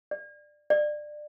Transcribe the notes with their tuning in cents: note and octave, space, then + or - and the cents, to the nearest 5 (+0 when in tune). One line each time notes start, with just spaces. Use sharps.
D5 +15
D5 +25